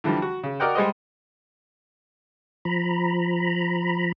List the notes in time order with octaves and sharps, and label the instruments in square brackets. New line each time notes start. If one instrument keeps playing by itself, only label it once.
[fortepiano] D3 E3 F3 G3
F#4
C#3
F#4 A#4 D5 D#5 F#5 G5
G3 G#3 C5 D#5
[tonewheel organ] F3 A#5 B5